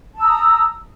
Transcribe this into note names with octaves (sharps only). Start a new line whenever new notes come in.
A5 A#5 D#6 E6